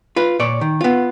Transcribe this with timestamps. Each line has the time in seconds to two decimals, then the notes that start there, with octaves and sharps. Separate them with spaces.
0.16 F4 B4
0.39 A#2 C#5 D5
0.61 D#3
0.81 B3 F4